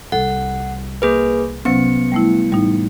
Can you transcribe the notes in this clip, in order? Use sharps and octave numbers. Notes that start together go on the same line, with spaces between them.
C2 A4 F#5
A#3 G#4 B4
C3 F#3 B3 C#4 C#7
G3 A3 E4
A1 G3 D#4